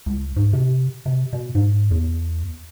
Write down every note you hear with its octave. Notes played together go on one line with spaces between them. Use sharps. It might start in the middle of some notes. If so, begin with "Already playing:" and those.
C#2
G#2
C3
C3
B2
G#2
E2